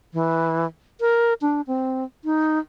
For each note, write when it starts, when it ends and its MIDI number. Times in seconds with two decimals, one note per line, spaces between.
0.13 0.66 52
1.01 1.34 70
1.41 1.61 62
1.67 2.04 60
2.25 2.59 63